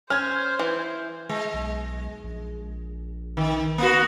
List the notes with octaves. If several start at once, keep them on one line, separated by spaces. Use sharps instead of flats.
C#4 C5 F6 G#6
E3
G#3
B1
A#1
D#3
A#3 B3 F#4